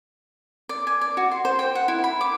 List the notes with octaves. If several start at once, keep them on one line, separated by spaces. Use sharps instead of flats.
D5
G#5
D5
F#4
C6
C5
G5
F#5
E4
B5
D6